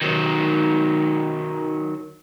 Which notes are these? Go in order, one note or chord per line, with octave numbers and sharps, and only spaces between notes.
D#3 F#3